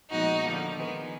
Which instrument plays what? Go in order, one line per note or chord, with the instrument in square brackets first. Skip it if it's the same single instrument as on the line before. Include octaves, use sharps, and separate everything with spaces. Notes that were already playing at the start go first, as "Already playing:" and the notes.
[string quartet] A#2 F3 G#3 B3 D#4 F#4
D3 F3 A#3
D#3 G#3 B3